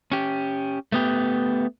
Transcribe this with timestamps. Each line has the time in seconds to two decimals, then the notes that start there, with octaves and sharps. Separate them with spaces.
0.12 C#4 G4
0.92 A3 B3 G4